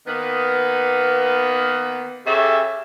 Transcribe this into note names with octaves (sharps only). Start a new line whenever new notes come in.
D#3 A#3 B3
C#3 G4 A4 E5